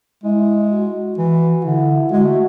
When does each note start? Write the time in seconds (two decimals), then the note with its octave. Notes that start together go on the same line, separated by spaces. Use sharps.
0.24 G#3 E4
0.72 F#4
1.18 E3
1.65 D3 E4
2.12 G#3 F#4
2.25 A3